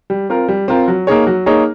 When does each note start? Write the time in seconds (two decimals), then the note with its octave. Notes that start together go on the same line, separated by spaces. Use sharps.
0.10 G3
0.30 C4 F4 A#4
0.48 G3
0.68 C4 F4 A#4
0.88 F#3
1.07 A#3 D#4 G#4 C#5
1.27 F#3
1.46 A#3 D#4 G#4 C#5